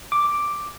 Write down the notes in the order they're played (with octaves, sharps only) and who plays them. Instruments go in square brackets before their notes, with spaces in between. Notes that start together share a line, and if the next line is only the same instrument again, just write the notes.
[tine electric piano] D6